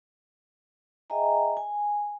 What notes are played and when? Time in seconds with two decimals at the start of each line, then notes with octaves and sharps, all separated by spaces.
1.10 G#4 D#5 E5 G5 G#5 A#5
1.57 G#5